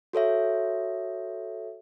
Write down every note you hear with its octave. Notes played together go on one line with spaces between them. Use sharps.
F#4 A4 C#5 E5